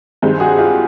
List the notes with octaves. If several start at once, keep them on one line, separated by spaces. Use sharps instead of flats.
G2 D#3 G#3 C4
F#4 G#4
F4 G4